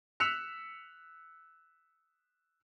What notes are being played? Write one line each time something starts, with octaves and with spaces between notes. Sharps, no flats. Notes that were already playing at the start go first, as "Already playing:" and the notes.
E6 F#6 B6 C#7 E7 F7